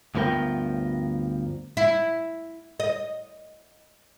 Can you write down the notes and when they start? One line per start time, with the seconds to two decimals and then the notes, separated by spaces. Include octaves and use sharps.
0.15 D2 G2 F3 B3 A#4 G5
1.77 E4
2.80 D#5